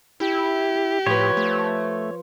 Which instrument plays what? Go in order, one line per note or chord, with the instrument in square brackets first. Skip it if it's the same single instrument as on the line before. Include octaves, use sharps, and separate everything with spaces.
[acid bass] E4 [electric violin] G4
[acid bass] A2 [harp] F3 B4 [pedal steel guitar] C#5
[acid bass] A3